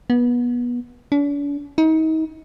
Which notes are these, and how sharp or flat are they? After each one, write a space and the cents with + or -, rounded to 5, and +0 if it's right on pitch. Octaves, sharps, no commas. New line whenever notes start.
B3 -25
D4 -45
D#4 +35